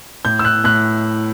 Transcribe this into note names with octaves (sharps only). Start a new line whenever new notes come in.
A2 G6
E6
F#6
A2 F#6